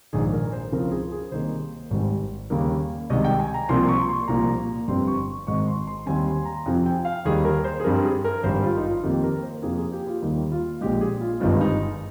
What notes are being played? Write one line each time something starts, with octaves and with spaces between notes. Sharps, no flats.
A#1 G#2 D#3 G#4
A#4
C5
C#2 C#3 F3 C4 A#4
G#4
G#4
C2 C3 D#3 A#3 C5
G#1 G#2 G3
D#2 C#3 G3 A#3
C2 C3 D#3 G#3 D#5
G5
G#5
A#5
C2 C3 F3 A#3 C6
C#6
C6
C2 A#2 F3 A#3 A#5
G1 F2 C3 G3 C4 C6
C#6
G#1 G#2 D#3 G#3 C4 C#6
C6
C6
D#2 D#3 G3 C4 G#5
C6
A#5
F2 C3 F3 C4 G#5
G5
F5
D#2 D#3 G3 G#4
A#4
C5
G#4
G2 G3 C4 A#4
G#4
A#4
G#1 G2 G3 C5
F4
D#4
F4
F2 D#3 A#3 G4
A#4
C5
F2 C3 F3 A#3 G#4
G#4
G4
F4
D#2 D#3 G3 A#3 D#4
F4
A#1 A#2 G#3 G4
G#4
F4
G1 G2 D#3 G#3 C4 F4
D#4